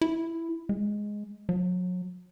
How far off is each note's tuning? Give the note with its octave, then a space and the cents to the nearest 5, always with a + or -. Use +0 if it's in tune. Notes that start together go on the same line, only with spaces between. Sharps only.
E4 +5
G#3 +0
F#3 -35